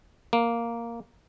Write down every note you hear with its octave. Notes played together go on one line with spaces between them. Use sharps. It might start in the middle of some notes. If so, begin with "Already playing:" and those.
A#3